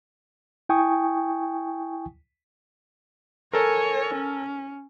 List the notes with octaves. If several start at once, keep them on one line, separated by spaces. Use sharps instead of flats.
E4 G5 G#5 C#6 D#6
A4 A#4 C#5 G#5
C#4